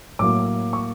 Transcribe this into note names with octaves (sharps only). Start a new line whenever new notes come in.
A2 F#3 A#3 D6
C#6